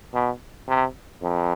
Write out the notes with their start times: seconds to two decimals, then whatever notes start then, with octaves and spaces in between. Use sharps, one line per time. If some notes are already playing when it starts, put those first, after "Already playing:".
0.14 B2
0.68 C3
1.22 F2